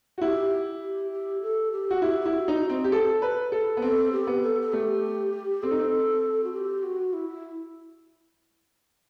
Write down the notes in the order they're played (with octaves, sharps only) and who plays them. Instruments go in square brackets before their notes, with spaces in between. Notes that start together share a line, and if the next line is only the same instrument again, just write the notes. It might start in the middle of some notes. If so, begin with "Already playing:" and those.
[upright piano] F#4
[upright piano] E4 [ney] G4
[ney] G4
G4
A4
G4
[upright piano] F#4
[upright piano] E4 [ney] G4
[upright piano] E4 [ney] G4
[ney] F#4
[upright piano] D#4
C4
G4
A4
B4
A4
B3
[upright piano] C4 [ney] A4
[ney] G4
[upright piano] B3
[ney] A4
A4
[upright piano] A3 [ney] G4
[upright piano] C4 [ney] A4
[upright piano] D#4
C4
[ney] F#4
G4
F#4
E4